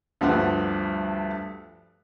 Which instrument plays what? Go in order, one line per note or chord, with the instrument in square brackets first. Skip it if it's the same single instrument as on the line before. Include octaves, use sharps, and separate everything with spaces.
[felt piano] D2 G2 F3 G3 B4 F#5